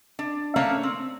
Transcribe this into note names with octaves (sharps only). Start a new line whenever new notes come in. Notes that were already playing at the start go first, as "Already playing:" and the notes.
D4
A3 A#3 C#4 D4 C#5 F5
C4